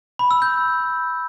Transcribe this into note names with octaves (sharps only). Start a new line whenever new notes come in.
B5
E6
G6